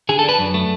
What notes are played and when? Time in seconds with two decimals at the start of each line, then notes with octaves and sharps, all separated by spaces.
0.09 D3 G#4
0.19 A4
0.24 D4 B4
0.39 F#2
0.54 A3